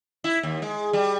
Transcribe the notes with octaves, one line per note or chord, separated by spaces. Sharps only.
E4
D#2
G#3
G3